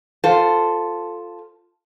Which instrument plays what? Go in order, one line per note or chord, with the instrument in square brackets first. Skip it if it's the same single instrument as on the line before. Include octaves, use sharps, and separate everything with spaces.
[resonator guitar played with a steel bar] F4 A4 C5